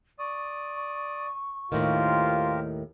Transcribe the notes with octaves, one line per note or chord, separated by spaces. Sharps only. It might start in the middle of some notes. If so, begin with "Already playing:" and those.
D5 C#6 D#6
D#2 A2 D#3 F4 G4 A#4 C5